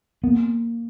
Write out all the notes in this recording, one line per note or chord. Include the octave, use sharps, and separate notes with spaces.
A#3 B3